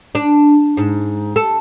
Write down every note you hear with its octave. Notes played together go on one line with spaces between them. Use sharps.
D4
G#2
A4